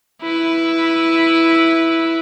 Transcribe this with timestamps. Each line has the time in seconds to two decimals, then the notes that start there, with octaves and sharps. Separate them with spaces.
0.22 E4 B4